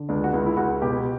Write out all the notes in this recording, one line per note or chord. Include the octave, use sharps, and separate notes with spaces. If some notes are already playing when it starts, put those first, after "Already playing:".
Already playing: D3
C#2 D4
F#4
C#2 E4
E4
C#2 F#4
B2 G4